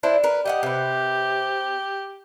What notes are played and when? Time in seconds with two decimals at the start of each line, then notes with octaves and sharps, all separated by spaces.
0.03 D4 E4 C5
0.24 A#4 B4
0.46 G4 D#5 E5 F#5
0.63 C3 B4